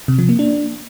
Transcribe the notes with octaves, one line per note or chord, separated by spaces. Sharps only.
C3
F3
A#3
D4